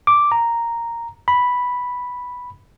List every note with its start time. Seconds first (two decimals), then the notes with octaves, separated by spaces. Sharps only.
0.07 D6
0.32 A#5
1.28 B5